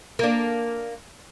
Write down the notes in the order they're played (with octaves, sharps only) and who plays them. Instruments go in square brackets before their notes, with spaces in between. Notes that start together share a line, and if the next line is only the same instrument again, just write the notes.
[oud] A#3 D4